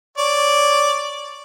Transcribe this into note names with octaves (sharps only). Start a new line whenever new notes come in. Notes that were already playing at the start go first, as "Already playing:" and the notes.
C#5 D5